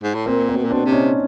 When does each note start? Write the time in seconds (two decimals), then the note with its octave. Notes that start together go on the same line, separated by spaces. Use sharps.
0.03 G#2
0.15 A2
0.26 A#2 A#3 C4
0.49 A#3 C4
0.56 B2
0.65 A#2
0.70 B2 C4 D4
0.85 C3
0.92 C#4 D#4